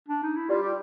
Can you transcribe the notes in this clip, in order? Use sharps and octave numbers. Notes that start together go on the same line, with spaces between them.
D4
D#4
E4
G3 F4
G4